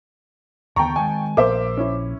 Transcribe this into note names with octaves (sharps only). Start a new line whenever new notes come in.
D#2 D3 B3 G5 A5 A#5 C#6
D#3 G#3 G#5
A#1 A#3 C5 E5 D6
C#4 E4